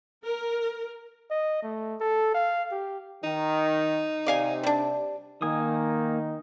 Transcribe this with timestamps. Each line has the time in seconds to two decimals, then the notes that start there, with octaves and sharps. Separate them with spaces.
0.24 A#4
1.30 D#5
1.63 A3
2.00 A4
2.34 F5
2.71 G4
3.24 D#3 D#4
4.26 C3 D5 F5 G#5
4.63 G3 D4
5.42 D#3 A#3 D#4 G#5 D#6